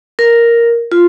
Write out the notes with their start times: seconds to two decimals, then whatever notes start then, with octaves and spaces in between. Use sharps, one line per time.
0.19 A#4
0.92 F4